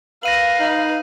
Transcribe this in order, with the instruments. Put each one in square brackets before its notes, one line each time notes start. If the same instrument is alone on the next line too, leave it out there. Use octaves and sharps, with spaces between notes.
[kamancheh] B4 F5 [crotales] A#6 D#7 F#7
[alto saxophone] D#4